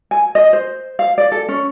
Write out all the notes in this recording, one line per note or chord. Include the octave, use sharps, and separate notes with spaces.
G#5
D#5
C5
F5
D5
A4
C#4